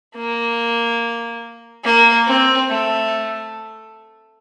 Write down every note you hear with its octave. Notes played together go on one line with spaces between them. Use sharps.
A#3
A#3
C4
A3